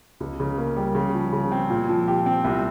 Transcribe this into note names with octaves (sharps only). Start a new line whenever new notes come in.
C#2
C#3
A#3
G3
C#3
F3
C#3
C4
A#2
F3
G4
C4
C2